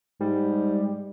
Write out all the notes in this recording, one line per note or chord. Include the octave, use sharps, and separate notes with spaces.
G#2 G3